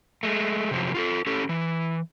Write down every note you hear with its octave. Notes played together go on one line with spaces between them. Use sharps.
G#3 A3
C3 F3 F#3
F4 F#4 A4
C#4 G4 A4
E3